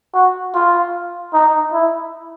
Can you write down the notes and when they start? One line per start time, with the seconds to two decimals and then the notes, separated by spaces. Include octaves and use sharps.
0.14 F#4
0.55 F4
1.34 D#4
1.73 E4